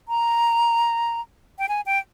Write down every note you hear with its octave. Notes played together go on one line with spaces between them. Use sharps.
A#5
G5
G#5
G5